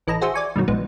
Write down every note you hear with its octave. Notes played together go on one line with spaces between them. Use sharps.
A1 E3 A4 D#5 A#5
F#4 G#4 C5 E5
D5 G#5 C#6
G2 B2 D#3 F#3
A#1 G#2 B3